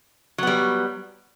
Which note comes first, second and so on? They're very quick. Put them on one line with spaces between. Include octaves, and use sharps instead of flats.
F#3 B3 G3